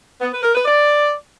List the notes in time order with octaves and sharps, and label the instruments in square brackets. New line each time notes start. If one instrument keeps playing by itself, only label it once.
[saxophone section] B3
B4
A#4
B4
D5